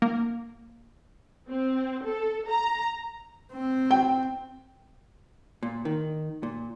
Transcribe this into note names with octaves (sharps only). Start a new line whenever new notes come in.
A#3
C4
A4
A#5
C4
G5
A#2
D#3
A#2